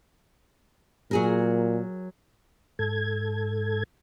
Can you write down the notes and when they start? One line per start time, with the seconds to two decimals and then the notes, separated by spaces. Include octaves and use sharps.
1.11 A#2 F#3 G#4 A#4
2.79 G#2 A4 G#6